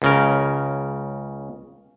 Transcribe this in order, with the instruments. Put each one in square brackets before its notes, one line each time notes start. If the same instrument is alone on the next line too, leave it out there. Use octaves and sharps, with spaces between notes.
[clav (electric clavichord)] C#2 C#3 A#4